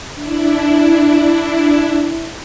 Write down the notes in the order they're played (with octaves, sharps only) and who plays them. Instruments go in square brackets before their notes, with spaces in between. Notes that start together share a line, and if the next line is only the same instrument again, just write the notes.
[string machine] D4 E4